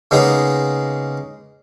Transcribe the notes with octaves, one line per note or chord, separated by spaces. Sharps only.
C#3 G#3 A#3 B3 D#4 G#4